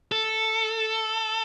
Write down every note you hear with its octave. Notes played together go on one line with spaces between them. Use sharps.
A4